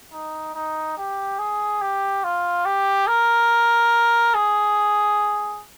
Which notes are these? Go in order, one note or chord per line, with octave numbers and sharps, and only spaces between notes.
D#4
D#4
G4
G#4
G4
F4
G4
A#4
G#4